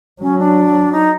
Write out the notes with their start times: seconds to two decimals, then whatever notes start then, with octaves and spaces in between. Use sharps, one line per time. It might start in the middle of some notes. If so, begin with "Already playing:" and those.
0.22 F#3 C#4
0.39 D4
0.92 D#4